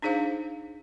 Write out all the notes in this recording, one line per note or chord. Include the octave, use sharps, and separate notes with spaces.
D4 D#4 G#4 C5 F5